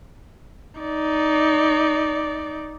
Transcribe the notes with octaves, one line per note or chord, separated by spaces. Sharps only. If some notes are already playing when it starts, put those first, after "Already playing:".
D#4 D5